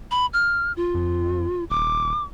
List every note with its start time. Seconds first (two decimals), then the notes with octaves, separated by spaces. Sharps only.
0.11 B5
0.34 F6
0.77 F4
0.94 F2
1.70 D#1 D6